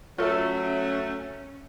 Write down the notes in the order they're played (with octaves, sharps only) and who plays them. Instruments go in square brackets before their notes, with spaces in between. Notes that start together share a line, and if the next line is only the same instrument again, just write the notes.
[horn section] F#3 A3 [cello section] C#4 [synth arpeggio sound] F4 A4 [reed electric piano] C#5 E5